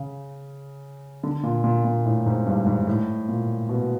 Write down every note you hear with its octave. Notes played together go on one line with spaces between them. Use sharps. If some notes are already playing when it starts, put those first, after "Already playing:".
Already playing: C#3
D3
A#2
A#2
A#2
A2
G#2
G2
G#2
A2
A#2
B2